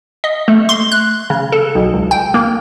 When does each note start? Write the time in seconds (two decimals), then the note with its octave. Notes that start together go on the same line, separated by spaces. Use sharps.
0.24 D#5
0.48 A3
0.69 C6
0.92 F#6
1.30 C#3
1.52 A4
1.75 B1
1.94 C#2
2.11 G5
2.34 A#3